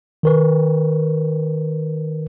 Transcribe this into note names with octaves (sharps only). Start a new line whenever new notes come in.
D#3 A#4 B4